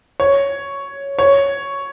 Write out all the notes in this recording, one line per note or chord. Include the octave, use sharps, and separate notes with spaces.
C#5
C#5